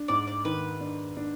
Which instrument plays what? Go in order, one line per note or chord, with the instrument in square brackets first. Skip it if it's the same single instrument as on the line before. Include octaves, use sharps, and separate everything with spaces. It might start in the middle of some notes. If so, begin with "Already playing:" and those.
Already playing: [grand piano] D4
[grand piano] G#2 [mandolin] D5
[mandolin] D5
[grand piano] D#3 [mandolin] B4
[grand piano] D4
D4